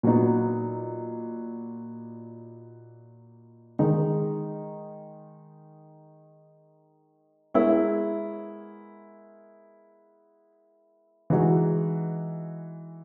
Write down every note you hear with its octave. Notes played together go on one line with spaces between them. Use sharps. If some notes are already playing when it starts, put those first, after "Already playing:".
A#2 F#3 B3 D#4
D#3 G#3 D#4 A#4
G#3 B3 E4 A#4 C#5
E3 G#3 D#4 F#4